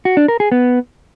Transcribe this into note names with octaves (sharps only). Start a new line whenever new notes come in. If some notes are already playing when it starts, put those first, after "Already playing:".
F#4
D4
A#4
G#4
B3